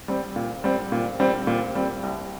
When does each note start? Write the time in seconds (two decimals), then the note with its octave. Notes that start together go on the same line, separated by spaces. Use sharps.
0.08 G3 C4
0.36 A#2
0.64 G3 C4
0.92 A#2
1.20 G3 C4
1.47 A#2
1.75 G3 C4
2.03 C2